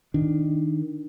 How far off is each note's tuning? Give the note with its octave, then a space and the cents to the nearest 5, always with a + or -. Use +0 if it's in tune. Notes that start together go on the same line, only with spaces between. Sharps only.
D#3 +5 D4 +0